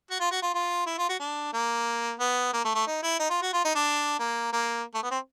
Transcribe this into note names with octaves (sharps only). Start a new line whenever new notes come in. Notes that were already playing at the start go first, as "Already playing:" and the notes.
F#4
F4
F#4
F4
F4
E4
F4
F#4
D4
A#3
B3
A#3
A3
A3
D#4
E4
D#4
F4
F#4
F4
D#4
D4
A#3
A#3
A3
B3
C4